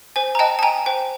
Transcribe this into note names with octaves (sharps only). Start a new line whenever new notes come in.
C5 G#5
A#5
D#5 G5 A5
A5
G5 G#5 A#5
C5 G5